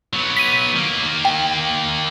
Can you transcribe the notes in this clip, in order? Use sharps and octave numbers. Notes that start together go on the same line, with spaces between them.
F#3 B3
B6 D#7
D#3 A#3
G5